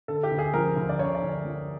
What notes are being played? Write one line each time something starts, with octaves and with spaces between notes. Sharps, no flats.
D3 A4
G4
D2
G#4
F3 A#4
D2
D5
D3 C#5
D5
D2
C#5
F3